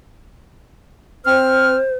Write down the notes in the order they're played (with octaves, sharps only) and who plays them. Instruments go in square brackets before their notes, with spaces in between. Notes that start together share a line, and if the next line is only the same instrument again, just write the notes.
[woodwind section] C4 F6 [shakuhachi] C5